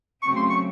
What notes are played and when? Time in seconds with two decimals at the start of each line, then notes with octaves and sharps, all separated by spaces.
0.22 C#3 F#3 A3 C4 C#6
0.36 C6
0.50 C#6